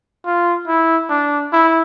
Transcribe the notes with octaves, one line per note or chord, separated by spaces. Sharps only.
F4
E4
D4
E4